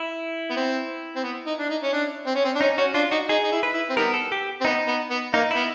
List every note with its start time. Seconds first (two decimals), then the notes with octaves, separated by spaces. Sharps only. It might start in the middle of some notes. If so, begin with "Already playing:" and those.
Already playing: E4
0.50 B3
0.56 C4
1.16 C4
1.24 B3
1.47 D#4
1.59 D4
1.70 D#4
1.83 C#4
1.93 D4
2.27 C4
2.35 C#4
2.45 C4
2.55 D4
2.61 C#4 D#4
2.78 C#4 F#4
2.94 D4 F4
3.11 D#4 F#4
3.29 D#4 G#4
3.44 D#4
3.52 E4
3.63 B4
3.74 E4
3.89 C4
3.97 D#3 G3 B3 A#4
4.14 A4
4.32 G4
4.61 C4
4.65 B3 D#4
4.87 B3
5.10 B3
5.34 A#3 D#4
5.51 E4
5.56 B3